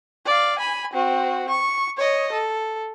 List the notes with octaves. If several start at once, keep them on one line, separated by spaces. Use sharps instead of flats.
D5 F5
G#5 B5
C4 F#4
C#6
C#5 D#5
A4